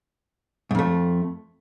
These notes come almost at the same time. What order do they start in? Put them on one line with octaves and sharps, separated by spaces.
G#2 F2 A3